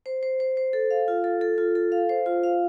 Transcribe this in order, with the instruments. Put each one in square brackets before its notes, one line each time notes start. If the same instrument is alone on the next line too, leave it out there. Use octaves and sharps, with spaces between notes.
[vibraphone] C5
C5
C5
C5
A4
F5
F4
A4
A4
F4
A4
F5
C5
F4
F5